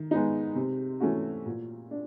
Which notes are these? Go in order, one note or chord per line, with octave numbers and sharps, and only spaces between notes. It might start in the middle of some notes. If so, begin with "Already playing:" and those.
Already playing: D#3
G#3 B3 D#4
C3
E3 A3 C#4 F#4
A#2
D4